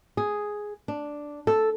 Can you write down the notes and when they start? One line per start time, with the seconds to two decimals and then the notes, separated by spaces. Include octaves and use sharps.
0.17 G#4
0.88 D4
1.47 A4